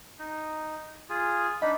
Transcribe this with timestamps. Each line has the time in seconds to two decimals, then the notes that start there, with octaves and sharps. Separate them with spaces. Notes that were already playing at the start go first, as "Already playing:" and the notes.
0.19 D#4
1.09 F4 G#4
1.62 D4 D#4 D#5 B5